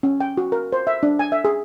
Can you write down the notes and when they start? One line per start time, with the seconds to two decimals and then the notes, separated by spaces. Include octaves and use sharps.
0.03 C#4
0.21 G5
0.37 F#4
0.52 A#4
0.73 C5
0.87 E5
1.03 D4
1.19 G#5
1.32 E5
1.45 G#4